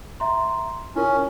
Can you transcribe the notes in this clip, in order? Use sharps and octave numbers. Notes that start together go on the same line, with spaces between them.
E5 A#5 C6
C#4 E4 F4 A#4